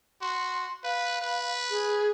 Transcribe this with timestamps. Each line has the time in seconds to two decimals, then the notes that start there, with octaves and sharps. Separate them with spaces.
0.21 F#4 C6
0.84 B4 F5
1.22 B4
1.70 G#4